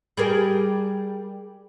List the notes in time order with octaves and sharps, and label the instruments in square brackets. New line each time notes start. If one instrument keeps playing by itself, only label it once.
[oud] G3 G#4 A#4